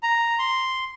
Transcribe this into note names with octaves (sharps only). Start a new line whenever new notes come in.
A#5
C6